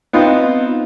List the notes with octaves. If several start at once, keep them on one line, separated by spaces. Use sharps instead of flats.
B3 C4 D#4 F4 C5